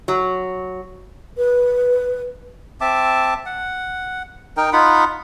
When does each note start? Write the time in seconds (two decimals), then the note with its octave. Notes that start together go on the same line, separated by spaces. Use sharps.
0.08 F#3
1.37 B4
2.81 C4 E5 A5 D6
3.46 F#5
4.57 D#4 A#4 G5
4.73 D#4 F4 F#5 B5